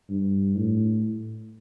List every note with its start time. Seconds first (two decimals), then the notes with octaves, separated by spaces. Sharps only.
0.10 G2
0.57 A2